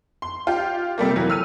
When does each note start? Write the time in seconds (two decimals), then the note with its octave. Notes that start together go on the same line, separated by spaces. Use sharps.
0.22 C6
0.47 F4 G4
0.98 C3 G3 A3 A#3
1.16 E3 F#3
1.30 E6 F6 D#7